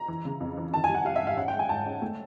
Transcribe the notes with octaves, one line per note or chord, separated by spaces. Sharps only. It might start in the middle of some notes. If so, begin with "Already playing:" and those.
Already playing: A#5
E3
C#3
F2
E3
D#3 A5
G#5
G3
F#5
G3 F5
E5
G#2
F5
C#4 F#5
G5
G#3
G#5
G#2 A5
C#4
A3